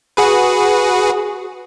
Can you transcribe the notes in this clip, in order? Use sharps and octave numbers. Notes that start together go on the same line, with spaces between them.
F#4 G#4 B4